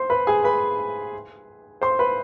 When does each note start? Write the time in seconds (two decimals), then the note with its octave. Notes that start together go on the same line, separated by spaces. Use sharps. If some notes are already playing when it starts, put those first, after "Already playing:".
Already playing: C5 C6
0.10 B4 B5
0.27 G#4 G#5
0.44 B4 B5
1.82 C5 C6
1.99 B4 B5